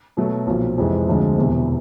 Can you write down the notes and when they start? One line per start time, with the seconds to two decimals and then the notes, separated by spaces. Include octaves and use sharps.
0.17 B2 F#3 A3
0.47 B1 A#2 F3
0.78 F2 C3 E3 G#3
1.08 D2 D3 F3 G#3 C4
1.38 E1 E2 C3 E3